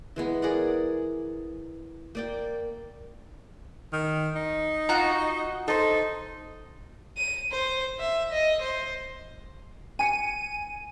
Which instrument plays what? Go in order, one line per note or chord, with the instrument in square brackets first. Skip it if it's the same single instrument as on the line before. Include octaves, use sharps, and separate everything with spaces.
[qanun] E3 G#3 B3
G#4 A#4 D5 F#5
A#3 D5 G5
[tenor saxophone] D#3
D#4
[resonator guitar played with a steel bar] F4 [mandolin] F#4 A#5
[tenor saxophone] D#4 [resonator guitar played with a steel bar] A4 C5
[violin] D#7
C5
E5
D#5
C5
[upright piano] G#5 C#7 [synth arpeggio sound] D#7